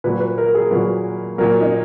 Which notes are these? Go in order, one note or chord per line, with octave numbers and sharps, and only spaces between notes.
A#2 F#3 B4
B4
A#4
G#4
A#2 F#3 B4
A#2 F#3 A#4
D#4